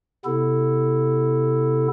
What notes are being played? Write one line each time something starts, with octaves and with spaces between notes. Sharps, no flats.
C3 B3 E4 A4